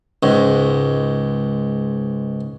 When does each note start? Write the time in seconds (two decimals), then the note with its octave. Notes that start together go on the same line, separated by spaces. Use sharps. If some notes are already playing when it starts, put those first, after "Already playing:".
0.23 C#2 G#2